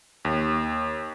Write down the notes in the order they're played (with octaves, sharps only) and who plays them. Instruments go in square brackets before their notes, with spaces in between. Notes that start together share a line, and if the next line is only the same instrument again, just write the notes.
[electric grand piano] D#2